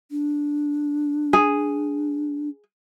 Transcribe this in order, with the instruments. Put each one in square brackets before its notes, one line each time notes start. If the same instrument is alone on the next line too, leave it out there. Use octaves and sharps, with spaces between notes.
[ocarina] D4
[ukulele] G#4